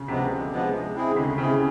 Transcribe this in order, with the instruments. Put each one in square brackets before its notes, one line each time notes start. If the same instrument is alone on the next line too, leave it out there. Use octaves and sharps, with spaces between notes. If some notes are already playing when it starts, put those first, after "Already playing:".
Already playing: [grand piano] C#3
[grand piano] C3 [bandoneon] F3 G#3 B3 D4
[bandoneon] D3
F3 G#3 B3 D4
G#3
C4 E4 G#4
[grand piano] D3
[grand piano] C#3 [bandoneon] G#3
[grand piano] C#3 [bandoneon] C4 E4 G#4